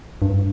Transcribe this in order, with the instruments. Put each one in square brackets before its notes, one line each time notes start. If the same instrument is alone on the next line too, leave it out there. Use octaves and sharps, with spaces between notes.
[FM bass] G2